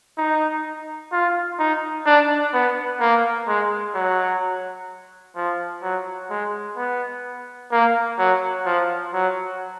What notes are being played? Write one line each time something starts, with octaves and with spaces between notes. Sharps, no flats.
D#4
F4
D#4
D4
B3
A#3
G#3
F#3
F3
F#3
G#3
B3
A#3
F#3
F3
F#3